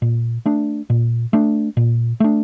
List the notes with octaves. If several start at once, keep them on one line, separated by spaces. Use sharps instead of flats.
A#2
A3 D4
A#2
A3 D4
A#2
A3 D4